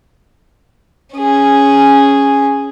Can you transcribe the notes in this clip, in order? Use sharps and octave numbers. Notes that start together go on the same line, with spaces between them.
C#4 G#4